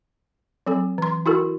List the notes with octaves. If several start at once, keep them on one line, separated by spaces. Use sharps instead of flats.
F#3 C4 A4
E3 C6
E4 F#4 A4 A#4